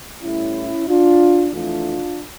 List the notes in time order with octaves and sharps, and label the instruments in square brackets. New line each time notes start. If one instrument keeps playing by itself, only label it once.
[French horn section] A2 G3 C#4 E4
D4 F4
F2 E3 A3 D4 F4